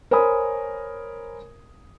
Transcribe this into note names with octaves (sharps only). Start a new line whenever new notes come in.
A#4 C5 C#5 G#5 B5 D#6